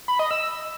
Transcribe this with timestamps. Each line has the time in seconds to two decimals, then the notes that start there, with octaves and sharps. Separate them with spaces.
0.08 B5
0.19 D#5
0.31 E6